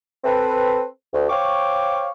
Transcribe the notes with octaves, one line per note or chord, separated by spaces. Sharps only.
C4 A4 B4
D2
C5 C#5 F5 G5 C#6 D6